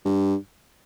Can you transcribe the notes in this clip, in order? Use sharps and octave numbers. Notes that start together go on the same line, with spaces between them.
G2